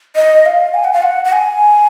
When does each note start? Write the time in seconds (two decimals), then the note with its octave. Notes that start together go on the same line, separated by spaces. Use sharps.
0.15 D#5
0.46 F5
0.74 G#5
0.84 F#5
0.93 F5
1.02 F#5
1.25 F#5
1.32 G#5